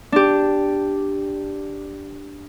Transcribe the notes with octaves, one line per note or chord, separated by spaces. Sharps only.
D4 G4